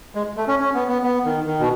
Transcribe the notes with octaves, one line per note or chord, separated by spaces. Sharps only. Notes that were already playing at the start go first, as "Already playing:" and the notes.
G#3
A3
C#4
C#4
B3
B3
B3
D#3
D#3
B2